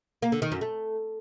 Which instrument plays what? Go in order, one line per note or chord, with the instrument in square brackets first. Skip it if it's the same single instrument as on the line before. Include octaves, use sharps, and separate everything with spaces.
[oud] A#3
D3
D#3
F#2
A3